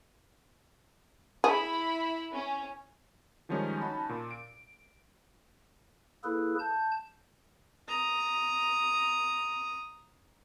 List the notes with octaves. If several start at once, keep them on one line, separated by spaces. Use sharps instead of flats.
E4 G#4 B5
C#4
D#3 F3 G3 G#3 C#4 D#4
C#4 D#4 F#4 A5 B5
A#2
D7
A#3 E4 G#4 A4 B4
A5 G6
A#5 D#6